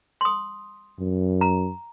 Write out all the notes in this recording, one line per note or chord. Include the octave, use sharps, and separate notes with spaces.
C6 D#6
F#2
A#5